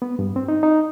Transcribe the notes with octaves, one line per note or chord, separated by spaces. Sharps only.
B3
G2
C4
D#4
D#4